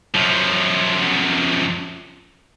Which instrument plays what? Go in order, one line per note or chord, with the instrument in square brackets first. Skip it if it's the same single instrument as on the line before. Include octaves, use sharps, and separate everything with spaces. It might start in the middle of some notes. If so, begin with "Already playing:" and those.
[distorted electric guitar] F#2 F3